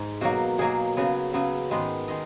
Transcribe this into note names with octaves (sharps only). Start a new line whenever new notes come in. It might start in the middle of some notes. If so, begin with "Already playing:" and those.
Already playing: G#2
B2 F#3 A#3 F#4
B2 F#3 A#3 G#4
C#3 F#3 B3
C#3 F#3 B3
G#2 D#3 G#3 B3
D#3 G#3 D#5